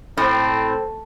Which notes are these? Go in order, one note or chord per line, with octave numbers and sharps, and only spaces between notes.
A2 C4